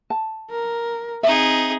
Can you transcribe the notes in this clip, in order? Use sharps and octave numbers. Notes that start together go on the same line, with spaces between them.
A5
A#4
C4 D#4 G#4 E5